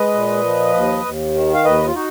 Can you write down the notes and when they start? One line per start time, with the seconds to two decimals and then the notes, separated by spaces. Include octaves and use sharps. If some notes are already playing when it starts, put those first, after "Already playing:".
Already playing: G#3 B4 D#5
0.14 A#2
0.44 F3
0.74 D#2
1.05 D#2
1.34 D#3
1.54 F5
1.65 D#2 B4 D#5
1.87 F4
1.95 D#4 F#4